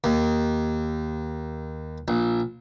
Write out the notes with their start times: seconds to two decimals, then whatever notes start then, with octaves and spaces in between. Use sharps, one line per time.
0.04 D#2
2.08 A#1